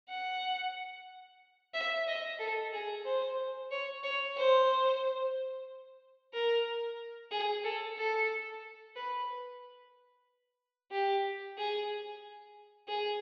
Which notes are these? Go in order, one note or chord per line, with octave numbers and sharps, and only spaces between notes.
F#5
E5
D#5
A4
G#4
C5
C#5
C#5
C5
A#4
G#4
A4
A4
B4
G4
G#4
G#4